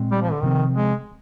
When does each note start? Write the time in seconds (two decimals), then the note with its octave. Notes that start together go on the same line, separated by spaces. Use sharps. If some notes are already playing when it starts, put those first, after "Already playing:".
Already playing: A#2 G#3 C4
0.12 G3
0.22 F3
0.32 D3
0.42 C3 D#3 F3 C4
0.73 G#3